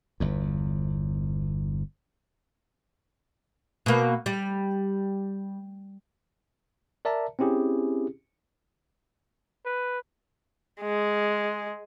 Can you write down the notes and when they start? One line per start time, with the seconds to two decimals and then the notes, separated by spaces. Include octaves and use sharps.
0.20 G1 E2
3.86 B2 A#3
4.26 G3
7.05 A#4 D5 E5 A5 A#5
7.39 C4 C#4 E4 G4 G#4
9.66 B4
10.81 G#3